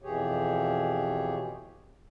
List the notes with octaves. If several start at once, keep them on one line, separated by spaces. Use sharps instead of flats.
F2 B2 E3 G4 G#4 C#5